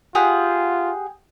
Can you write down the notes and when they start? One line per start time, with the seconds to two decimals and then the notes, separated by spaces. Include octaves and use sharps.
0.15 F4 G4 G#4 F#5